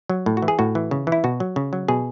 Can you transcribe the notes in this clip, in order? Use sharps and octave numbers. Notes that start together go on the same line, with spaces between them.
F#3
A2
F#4
E3
G#4
A2 F#4
E3
C#3
E3
E4
B2 F#4
F#3
C#3
F#3
B2 G#4